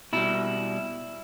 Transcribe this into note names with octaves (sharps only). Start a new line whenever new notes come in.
B2 G3 E4